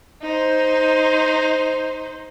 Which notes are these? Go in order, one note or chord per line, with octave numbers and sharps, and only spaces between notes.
D#4 C5